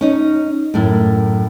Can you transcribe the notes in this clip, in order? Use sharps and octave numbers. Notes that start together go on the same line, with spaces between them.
C#4 D#4
F#2 A2